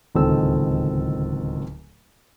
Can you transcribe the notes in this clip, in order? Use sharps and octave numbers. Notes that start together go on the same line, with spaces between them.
D1 C#2 D#3 C4 A4 E6